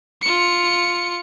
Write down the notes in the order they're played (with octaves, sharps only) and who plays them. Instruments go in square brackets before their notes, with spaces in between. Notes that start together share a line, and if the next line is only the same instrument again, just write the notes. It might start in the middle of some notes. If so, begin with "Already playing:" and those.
[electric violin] F4 C#7